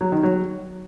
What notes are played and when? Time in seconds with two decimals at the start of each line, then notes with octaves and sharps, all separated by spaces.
0.01 F#3
0.12 D#3
0.23 F#3